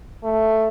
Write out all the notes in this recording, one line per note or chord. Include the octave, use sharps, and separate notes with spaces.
A3